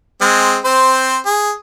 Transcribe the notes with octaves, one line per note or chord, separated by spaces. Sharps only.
G#3 C4
C4 C5
G#4